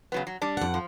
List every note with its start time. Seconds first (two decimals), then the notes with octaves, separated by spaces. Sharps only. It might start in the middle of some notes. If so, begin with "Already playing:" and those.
0.12 C#3 F#3 B3
0.27 F#3
0.42 G3 D4
0.57 F2 F#5
0.74 F3